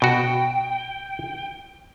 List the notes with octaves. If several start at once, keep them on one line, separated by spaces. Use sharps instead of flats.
B2 F#4 G5